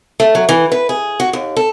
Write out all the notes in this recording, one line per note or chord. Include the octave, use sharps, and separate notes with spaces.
A3
F#3
E3
B4
G#4
F#4
D#2
A4